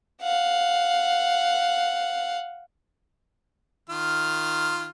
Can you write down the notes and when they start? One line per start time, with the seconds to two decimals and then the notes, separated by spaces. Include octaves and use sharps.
0.22 F5 F#5
3.90 D#3 F4 F6